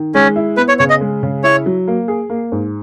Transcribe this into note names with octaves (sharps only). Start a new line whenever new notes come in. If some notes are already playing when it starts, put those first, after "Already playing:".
Already playing: D#3
G#3 C#4
E4
B3 B4
C#5
C#3 C#5
D#5
G#3
C#3
E4 C#5
F#3
A#3
G#4
A#3
G#2